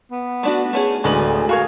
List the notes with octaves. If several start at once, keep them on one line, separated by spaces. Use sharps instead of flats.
B3
A3 D4 F#4
A3 C#4 G#4
D1 D2 G#3 B3 G#4 F#7
F#4 A#4 F5 C#6 G#6